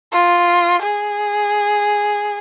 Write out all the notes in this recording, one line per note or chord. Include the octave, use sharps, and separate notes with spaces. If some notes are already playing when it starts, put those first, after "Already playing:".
F4
G#4